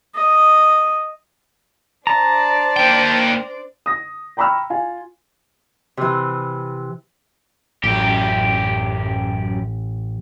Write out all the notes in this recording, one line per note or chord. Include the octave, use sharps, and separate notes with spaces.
D#5
D4 C5 D5 A5 A#5
A#3 G5
D#6 A#6
G5 A#5 B5 C#6 E6 F6
F4 G#5
C3 E3
A1 F#2 G4